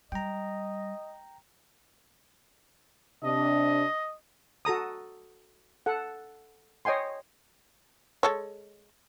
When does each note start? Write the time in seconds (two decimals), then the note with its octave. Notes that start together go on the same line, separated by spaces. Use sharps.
0.12 G3 D#5 G5 A#5
3.24 C3 D4 D#5
4.65 F#4 A4 A#5 D#6
5.86 A4 F#5
6.85 C#5 D#5 G5 G#5 C6
8.23 G#3 A4 C#5